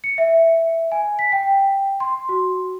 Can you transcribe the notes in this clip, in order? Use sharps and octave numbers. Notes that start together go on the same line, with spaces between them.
C#7
E5
G#5
B6
G5
C6
F#4